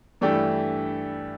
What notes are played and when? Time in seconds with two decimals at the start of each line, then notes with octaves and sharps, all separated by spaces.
0.21 G2 E3 A3 D4 G4